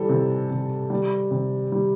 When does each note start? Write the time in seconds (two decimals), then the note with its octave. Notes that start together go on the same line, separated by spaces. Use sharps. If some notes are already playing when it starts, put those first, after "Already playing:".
Already playing: E3 G3 A4
0.09 C3
0.51 C3
0.90 G3
1.31 C3
1.72 G3